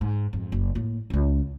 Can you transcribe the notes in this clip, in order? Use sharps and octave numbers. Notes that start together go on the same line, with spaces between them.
G#2
F2 G#2
F#1
A2 A#3
D#1 C#2